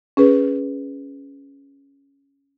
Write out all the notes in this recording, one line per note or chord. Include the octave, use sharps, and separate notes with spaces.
C#4 G#4 B4